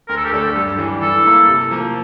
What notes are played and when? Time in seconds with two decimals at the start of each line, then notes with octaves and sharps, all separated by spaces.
0.09 D2 A#4
0.17 A4
0.25 G4
0.33 D3 A3 D4 A4
0.55 G2
0.78 E3 G3 D4
1.02 E3 A4
1.25 A#3 E4
1.48 C3
1.71 F3 A#3